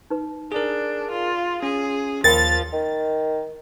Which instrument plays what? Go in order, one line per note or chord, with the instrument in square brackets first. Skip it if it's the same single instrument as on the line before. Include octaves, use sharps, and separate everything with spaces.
[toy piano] D#4 B4
[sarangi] D4 [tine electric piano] G#4 A#4
[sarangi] F4
[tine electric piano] C#4 [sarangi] G#4
[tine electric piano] D#2 [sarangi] F3 [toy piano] A#4 G5 B5 [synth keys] A6
[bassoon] D#3